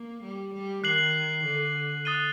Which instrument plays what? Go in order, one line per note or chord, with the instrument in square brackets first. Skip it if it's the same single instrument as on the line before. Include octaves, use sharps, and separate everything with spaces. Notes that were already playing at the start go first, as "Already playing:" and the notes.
Already playing: [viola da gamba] A#3
G3
G3
[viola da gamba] D#3 [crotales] F#6 C7 F#7
[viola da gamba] D3
[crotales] D#6 F#6 A6 D#7 G7